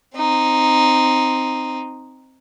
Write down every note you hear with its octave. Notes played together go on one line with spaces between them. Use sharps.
C4 D#4